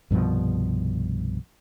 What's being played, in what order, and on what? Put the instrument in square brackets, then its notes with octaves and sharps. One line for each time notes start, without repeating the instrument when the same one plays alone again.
[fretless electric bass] C2 G2 B2 F3